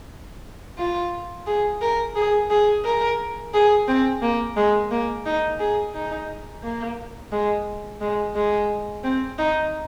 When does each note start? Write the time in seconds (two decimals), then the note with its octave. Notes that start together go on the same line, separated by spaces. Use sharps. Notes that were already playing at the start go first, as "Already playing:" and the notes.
0.78 F4
1.47 G#4
1.81 A#4
2.16 G#4
2.50 G#4
2.85 A#4
3.54 G#4
3.88 C4
4.22 A#3
4.56 G#3
4.91 A#3
5.26 D#4
5.60 G#4
5.94 D#4
6.63 A#3
7.32 G#3
8.01 G#3
8.35 G#3
9.04 C4
9.38 D#4